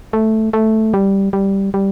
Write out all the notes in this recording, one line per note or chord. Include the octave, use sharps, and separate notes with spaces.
A3
A3
G3
G3
G3